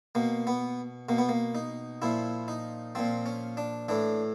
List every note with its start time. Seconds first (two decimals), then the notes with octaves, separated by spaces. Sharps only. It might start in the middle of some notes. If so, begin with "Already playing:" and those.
0.15 B2 A#3
0.47 B3
1.09 B2 A#3
1.18 B3
1.29 A#3
1.55 D#4
2.02 A#2 F3 E4
2.48 D#4
2.95 A#2 F3 C4
3.26 C#4
3.57 D4
3.89 A2 E3 D4